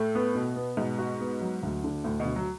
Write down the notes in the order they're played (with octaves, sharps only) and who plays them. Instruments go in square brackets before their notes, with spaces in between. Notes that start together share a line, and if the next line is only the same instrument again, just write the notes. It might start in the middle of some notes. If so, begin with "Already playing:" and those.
Already playing: [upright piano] A2 [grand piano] A3
[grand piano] B3
B2
B3
[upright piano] G#2 [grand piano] B2
[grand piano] F#4
B3
F#3
D2
D3
[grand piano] D2 [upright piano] A2
[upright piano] B2
[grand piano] D2
[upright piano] F#3